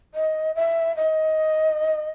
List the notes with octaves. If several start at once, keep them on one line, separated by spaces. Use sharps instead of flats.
D#5
E5
D#5